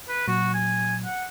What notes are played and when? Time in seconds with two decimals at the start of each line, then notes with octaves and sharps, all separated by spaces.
0.09 B4
0.28 A#2 F#3 F#4
0.54 G#5
1.05 F#5